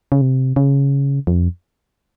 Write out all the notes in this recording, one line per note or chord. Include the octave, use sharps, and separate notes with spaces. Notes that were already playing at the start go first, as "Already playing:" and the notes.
C#3
C3
C#3
F2